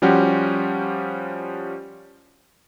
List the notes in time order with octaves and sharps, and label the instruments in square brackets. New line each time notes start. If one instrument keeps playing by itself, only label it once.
[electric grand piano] F3 G3 C#4 F#4 G4 C5